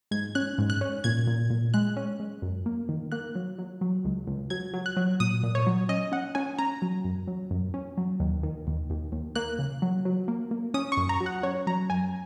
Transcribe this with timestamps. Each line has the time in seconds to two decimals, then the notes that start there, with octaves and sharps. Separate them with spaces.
0.11 G#2 G#6
0.35 C#4 F#6
0.58 G#2
0.70 F#6
0.81 C#4
1.04 A#2 G#6
1.27 A#2
1.50 A#2
1.74 G#3 F#6
1.97 C#4
2.20 G#3
2.42 F#2
2.66 A#3
2.89 D#3
3.12 A#3 F#6
3.35 F#3
3.58 F#3
3.81 F#3
4.05 C#2
4.27 C#2
4.50 F#3 G#6
4.74 F#3
4.86 F#6
4.97 F#3
5.20 A#2 D#6
5.43 A#2
5.55 C#5
5.67 F#3
5.89 C#4 D#5
6.12 C#4 F#5
6.35 C#4 G#5
6.59 C#4 A#5
6.82 F#3
7.05 F#2
7.28 F#3
7.51 F#2
7.74 C#4
7.97 F#3
8.20 D#2
8.43 D#3
8.67 D#2
8.90 D#2
9.12 D#2
9.35 A#3 F#6
9.59 C#3
9.82 F#3
10.05 F#3
10.28 A#3
10.51 A#3
10.74 C#4 D#6
10.92 C#6
10.97 F#2
11.09 A#5
11.20 F#3
11.26 F#5
11.43 C#4 C#5
11.67 F#3 A#5
11.90 F#2 G#5